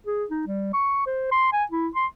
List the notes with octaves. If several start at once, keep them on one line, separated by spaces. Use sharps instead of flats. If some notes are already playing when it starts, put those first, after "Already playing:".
G#4
D#4
G3
C#6
C5
C6
G#5
E4
C6